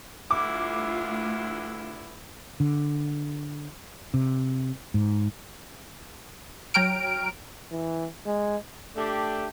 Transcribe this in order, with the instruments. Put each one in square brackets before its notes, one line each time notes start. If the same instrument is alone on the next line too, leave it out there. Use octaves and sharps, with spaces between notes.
[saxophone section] D2 G2 E4 [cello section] A3 F4 [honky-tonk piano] D6
[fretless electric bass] D3
C3
G#2
[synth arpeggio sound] F#3 C#5 G5 A#5 F6 D7
[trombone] E3
G#3
[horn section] A3 D4 G4